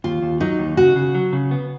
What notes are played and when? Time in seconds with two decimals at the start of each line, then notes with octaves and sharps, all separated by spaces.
0.04 D#2 F4
0.22 D#2
0.40 F#3 D#4
0.59 D#2
0.77 C#3 F#4
0.96 C#3
1.15 F#3
1.33 C#3
1.51 B3